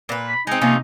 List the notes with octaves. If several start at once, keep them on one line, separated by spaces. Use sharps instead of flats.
A#2 B4
B5
G#3 C4 D#4
C3 F3 A#3 C#4